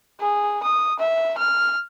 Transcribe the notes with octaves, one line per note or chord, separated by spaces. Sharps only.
G#4
D#6
E5
F6